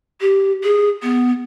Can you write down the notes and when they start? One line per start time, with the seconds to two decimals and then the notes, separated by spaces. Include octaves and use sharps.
0.21 G4
0.63 G#4
1.03 B3